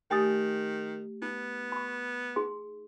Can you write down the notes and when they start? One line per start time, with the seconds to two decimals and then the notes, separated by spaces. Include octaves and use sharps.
0.11 D#3 A3 G4 G5 G#5 D#6 A6
1.22 B3 D#4
1.72 B5 C#6
2.36 D#4 G#4 C6